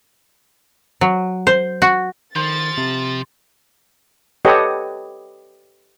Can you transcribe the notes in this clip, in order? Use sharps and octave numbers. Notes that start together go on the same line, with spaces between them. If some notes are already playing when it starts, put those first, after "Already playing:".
F#3
C5
F#4
D#3 F3 C5 A6
C3
G4 A4 B4 C#5 D#5 F#5